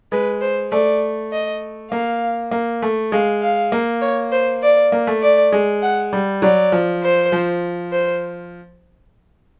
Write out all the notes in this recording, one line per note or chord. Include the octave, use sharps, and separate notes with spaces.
G#3 B4
C5
A3 D5
D#5
A#3 F5
A#3
A3
G#3 F5
F5
A#3
C#5
C5
D5
A#3
A3
D5
G#3
F#5
G3
F#3 D5
F3
C5
F3
C5